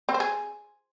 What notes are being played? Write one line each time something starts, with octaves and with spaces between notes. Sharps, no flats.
C4
C5
G#4